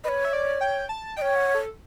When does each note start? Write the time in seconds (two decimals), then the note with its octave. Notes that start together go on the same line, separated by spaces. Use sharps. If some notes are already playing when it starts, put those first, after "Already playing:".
0.04 B4 C#5 D#5
0.25 E5
0.33 D5
0.61 G5
0.89 A5
1.16 D#5 G5
1.22 C#5
1.36 F#5
1.55 A4